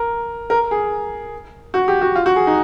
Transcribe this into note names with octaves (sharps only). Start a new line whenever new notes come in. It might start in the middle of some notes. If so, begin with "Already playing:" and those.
Already playing: A#4
A#4
G#4
F#4
G4
F#4
F4
F#4
G#4
D#4